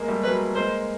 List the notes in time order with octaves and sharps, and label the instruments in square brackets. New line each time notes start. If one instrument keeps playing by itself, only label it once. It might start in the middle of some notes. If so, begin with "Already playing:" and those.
Already playing: [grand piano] G#3 A#3
G3 A3
[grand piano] F#3 G#3 [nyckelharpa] B4
[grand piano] G#3 A#3 [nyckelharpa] C5